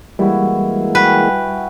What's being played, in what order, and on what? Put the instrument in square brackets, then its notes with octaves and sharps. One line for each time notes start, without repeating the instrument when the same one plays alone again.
[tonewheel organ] E3 G#3 A#3 [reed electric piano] G3 [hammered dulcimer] E4 F#4
[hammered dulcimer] F#4 G5 G#5 [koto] B4